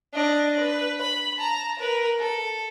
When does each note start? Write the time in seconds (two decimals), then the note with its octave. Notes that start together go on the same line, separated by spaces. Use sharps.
0.14 D4 D#5
0.59 B4
1.01 B5
1.37 A5 A#5
1.79 A#4 B4
2.18 A4